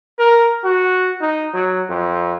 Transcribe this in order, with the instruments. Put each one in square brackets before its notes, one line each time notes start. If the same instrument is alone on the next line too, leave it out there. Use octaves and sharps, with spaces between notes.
[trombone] A#4
F#4
D#4
F#3
F2